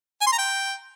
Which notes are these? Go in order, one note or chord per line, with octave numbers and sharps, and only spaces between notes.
G#5
C6
A#5
G5